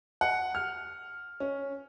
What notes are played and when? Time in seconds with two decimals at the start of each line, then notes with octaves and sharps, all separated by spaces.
0.21 F#5
0.55 F6
1.40 C#4